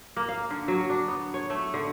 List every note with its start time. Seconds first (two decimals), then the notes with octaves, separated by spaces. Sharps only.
0.16 A#3
0.29 F5
0.50 D3
0.68 F#3
0.90 D4
1.08 B3
1.34 C#5
1.50 A3
1.74 D3